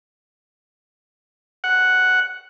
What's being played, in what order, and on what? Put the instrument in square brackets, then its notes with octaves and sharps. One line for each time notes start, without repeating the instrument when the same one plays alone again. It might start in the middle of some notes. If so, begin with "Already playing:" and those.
[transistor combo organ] F#5